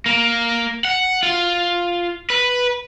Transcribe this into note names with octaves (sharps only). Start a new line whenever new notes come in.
A#3
F#5
F4
B4